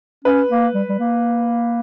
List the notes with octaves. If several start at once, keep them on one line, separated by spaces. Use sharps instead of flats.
C#4 B4
A#3
G3
G3
A#3